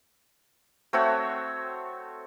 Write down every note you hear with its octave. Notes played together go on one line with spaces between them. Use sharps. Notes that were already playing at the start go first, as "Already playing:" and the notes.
A3 C4 F#4 C#5